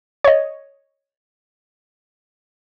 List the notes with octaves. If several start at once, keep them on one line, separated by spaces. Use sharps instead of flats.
C#5 D#5